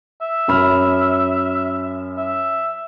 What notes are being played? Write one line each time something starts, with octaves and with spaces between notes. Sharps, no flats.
E5
F#2 B5 F6
E5